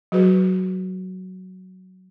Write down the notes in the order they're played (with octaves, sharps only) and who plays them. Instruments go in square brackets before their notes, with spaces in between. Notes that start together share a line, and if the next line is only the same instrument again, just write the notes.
[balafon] F#3 F#4 G#4 B4